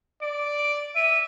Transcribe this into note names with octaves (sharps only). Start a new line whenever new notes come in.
D5 D7
E5 D#7